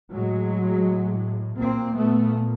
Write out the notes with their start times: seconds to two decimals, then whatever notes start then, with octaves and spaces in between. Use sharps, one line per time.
0.12 A2 F#3 G#3
1.58 A#2 A#3 C4
1.94 A3 B3